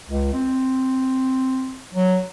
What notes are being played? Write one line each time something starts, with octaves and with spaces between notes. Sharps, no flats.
C#2
C4
F#3